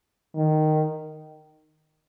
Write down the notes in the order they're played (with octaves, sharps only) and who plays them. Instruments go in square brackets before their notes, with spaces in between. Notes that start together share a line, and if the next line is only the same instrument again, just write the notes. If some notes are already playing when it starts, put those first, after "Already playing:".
[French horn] D#3